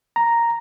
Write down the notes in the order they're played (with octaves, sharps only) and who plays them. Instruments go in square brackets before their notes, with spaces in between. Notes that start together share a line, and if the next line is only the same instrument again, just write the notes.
[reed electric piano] A#5